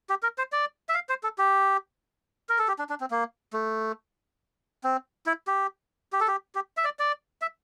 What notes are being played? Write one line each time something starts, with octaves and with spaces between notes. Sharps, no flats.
G4
A#4
C5
D5
E5
F5
C5
A4
G4
A#4
A4
G4
D4
D4
C4
A#3
A3
C4
E4
G4
G4
A4
G4
G4
E5
D5
D5
E5